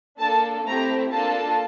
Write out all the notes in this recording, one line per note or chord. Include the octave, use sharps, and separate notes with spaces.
A#3 D4 A4 A5
A3 C4 E4 G4 A#5
A#3 D4 F4 A4 A5